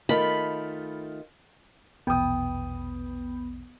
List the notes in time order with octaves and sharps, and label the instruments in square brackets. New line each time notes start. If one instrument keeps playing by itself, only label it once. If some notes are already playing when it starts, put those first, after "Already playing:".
[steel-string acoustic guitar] D#3 A3 F4 [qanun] B5
[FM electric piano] A#1 E2 B2 [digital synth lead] B3 [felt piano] G5 D#6